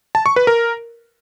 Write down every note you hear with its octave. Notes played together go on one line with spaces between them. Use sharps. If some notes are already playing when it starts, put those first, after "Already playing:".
A5
C#6
B4
A#4